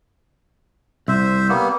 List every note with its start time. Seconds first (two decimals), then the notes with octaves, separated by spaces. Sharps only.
1.08 C2 C5 E5
1.49 G3 A#3 B3